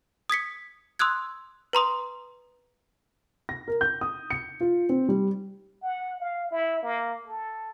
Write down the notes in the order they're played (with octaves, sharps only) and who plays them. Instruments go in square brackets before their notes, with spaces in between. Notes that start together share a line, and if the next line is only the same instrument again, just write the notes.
[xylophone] D#6 G#6 B6 C#7
C6 D#6 E6 F#6 G#6
B4 A#5 C6 D#6
[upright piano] A#6
A#4
G6
D#6
C#7
F4
C4
G3
[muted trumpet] F#5
F5
E4
A#3
A4